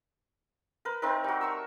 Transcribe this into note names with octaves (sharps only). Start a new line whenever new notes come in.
A#4 B4
A3 C4 D#4 A#4
G3 F#4
E5 C#6 E6